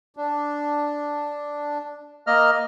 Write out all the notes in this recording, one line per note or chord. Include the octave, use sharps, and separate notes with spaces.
D4
A#3 D#5 F6